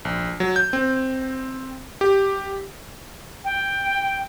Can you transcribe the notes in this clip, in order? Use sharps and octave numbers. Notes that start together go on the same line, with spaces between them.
A#1
F#3
G6
C4
G4
G5